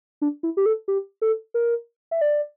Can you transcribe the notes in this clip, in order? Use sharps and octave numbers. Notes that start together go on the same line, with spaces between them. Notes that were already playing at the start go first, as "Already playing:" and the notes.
D4
E4
G4
A4
G4
A4
A#4
E5
D5